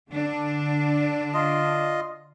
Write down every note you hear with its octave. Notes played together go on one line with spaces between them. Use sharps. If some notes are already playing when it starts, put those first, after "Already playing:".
D3 D4
F4 D#5